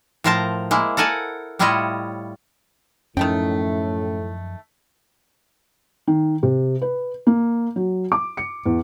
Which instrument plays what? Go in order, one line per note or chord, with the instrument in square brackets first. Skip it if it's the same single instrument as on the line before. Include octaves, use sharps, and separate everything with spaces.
[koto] A2 F3 A#4 C5 A5 A#5
G#3 A#3 E4
A4 A#4 F#5 G#5 A5
A2 G3 E4 F4 C#5 D#5
[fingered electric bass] F#2 F3 [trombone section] A2 [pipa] D#3 A3 G5 [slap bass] C#4
[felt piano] D#3
C3
B4
A#3
F#3
D6
C#7
E2